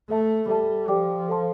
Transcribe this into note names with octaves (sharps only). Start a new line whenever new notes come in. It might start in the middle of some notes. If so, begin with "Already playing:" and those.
A3 A4 E5 A5
G3 A4 E5 A5
F3 G4 D5 G5 D6
A4 C5 F5 A5 C6